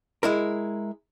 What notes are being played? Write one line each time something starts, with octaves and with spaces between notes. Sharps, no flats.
G#3 E4 A#4